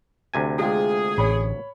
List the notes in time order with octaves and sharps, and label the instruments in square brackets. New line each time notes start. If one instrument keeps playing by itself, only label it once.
[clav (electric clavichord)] D2 C3 G#5
[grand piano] G#3 F4 G4 [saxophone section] G#4
[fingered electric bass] A1 [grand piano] C#5 B5